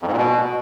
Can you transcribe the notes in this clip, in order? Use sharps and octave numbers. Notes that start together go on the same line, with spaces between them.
F2
G#2
A#2
B2